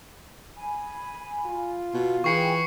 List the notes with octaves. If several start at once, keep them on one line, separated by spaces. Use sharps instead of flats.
G#5 B5
F4
B2
E3 G#4 G5 G#5 C#6 C7 C#7